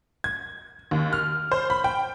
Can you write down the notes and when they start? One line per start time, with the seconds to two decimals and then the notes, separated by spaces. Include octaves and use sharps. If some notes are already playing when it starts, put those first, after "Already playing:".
0.24 G#6
0.91 D#2
1.13 F6
1.52 C5
1.70 B5
1.84 G5